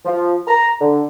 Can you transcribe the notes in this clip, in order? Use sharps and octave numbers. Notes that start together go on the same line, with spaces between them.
F3
A#5
D3